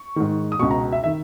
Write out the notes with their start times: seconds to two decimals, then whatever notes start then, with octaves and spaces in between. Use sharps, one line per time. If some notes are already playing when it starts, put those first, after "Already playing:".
Already playing: C#6
0.16 G#2 D#3
0.52 D#6
0.59 C#2 B2 C#6
0.71 A#5
0.92 E5
1.04 D#3 E5